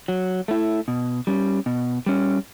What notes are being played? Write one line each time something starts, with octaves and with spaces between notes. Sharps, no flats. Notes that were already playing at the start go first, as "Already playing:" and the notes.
F#3
A3 E4
B2
G3 C#4
B2
G3 C#4